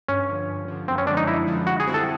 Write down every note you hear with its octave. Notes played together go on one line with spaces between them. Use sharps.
G2 C#4
D3 F3
G2
D3 F3
F#2 C4
C#4
D3 F3 G#3 D4
D#4
F#2 E4
D3 F3 G#3
D3 F#4
G#4
G3 C4 E4
A4